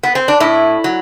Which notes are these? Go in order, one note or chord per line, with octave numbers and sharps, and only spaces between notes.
B3
C4
D4
A2 E4
F#3